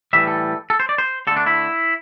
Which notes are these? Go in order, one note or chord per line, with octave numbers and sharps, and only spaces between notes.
A2 E3 G3 E5
A4
A4
C5
D5
C5
D3 A3 A4
D4
E4